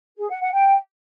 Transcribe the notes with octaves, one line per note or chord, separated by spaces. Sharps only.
G#4
F#5
F#5
G5